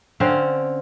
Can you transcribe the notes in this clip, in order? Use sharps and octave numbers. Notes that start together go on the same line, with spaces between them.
D3 C4 C#4 F5